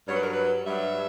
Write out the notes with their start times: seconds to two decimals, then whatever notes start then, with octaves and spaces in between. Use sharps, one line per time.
0.08 G2 F#3 C#5
0.16 B4
0.24 A#4
0.31 B4
0.65 G2 F#3 E5